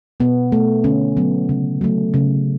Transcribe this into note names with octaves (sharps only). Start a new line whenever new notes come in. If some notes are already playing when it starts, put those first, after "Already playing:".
B2 B3
A3
D3 C#4
F#3 B3
C#3
F#3 A3
C#3